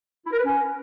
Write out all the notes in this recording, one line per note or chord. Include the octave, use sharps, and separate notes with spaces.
E4
A#4
B4
C#4